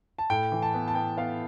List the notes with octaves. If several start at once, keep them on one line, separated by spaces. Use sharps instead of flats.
A5
A2 G5
E3
A5
B3
A5
B3 G5
B3 F5